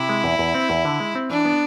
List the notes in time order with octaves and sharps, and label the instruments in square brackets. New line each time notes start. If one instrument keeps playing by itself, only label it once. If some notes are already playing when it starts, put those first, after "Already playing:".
Already playing: [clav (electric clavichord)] C3 [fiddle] E4
[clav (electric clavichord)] G#3
E2
E2
C4
E2
D3
G#3
C4
[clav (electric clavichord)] E3 [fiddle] D4
[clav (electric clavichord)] B3